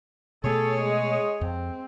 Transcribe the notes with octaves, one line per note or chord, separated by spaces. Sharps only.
B2 A3 G#4 A4 C#5
G#3
F2 C4